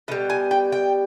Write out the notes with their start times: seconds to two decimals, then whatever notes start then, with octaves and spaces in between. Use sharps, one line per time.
0.08 B2 D#5
0.12 G3
0.30 G#5
0.51 G5
0.72 G5